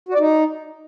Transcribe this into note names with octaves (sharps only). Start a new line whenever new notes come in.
F#4
D5
D#4